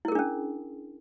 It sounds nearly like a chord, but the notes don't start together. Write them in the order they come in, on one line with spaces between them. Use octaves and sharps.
E4 A#4 G#4 D4 C#4